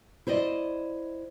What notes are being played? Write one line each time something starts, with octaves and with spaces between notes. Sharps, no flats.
E4 C5 D5 D#5